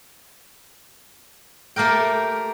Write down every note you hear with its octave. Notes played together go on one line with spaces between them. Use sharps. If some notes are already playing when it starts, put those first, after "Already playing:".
A3 A#3 G4 A#4 G5